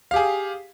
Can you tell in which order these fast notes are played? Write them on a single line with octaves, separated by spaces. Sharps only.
F5 G4 G#4